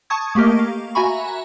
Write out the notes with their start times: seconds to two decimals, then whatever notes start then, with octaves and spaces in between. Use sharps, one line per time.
0.10 A5 C#6 D#6 G#6
0.35 A3 A#3 G4 A#4 D#5
0.59 F5
0.95 F#4 E5 G#5 A#5 B5 C#6